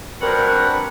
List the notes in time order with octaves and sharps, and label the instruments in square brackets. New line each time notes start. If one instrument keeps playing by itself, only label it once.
[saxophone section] G2 F#4 F#5 [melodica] C4 D4 B4 [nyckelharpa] A#4